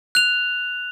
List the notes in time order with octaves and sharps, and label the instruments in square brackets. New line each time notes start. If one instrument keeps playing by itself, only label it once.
[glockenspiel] F#6 F7